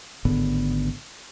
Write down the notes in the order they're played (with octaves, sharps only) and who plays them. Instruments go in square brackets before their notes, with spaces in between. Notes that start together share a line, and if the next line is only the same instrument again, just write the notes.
[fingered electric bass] G#1 A2 D3 B3